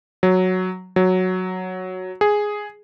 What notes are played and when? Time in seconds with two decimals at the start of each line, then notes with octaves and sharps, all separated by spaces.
0.23 F#3
0.96 F#3
2.21 G#4